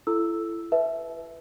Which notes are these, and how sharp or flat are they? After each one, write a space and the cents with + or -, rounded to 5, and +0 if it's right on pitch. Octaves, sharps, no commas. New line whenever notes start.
E4 +35 A4 -5 E6 +0
B4 +0 E5 -10 A5 -40